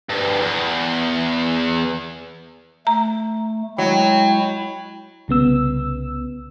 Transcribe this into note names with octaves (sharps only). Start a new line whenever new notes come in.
D2 G2
E2
A3 A#5
F#3 G#3 E4 G5
C2 C#3 B3 E6